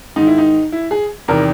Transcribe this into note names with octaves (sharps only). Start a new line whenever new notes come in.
G#2 D#3 D#4
E4
D#4
E4
G#4
E2 C3 D#3 A#4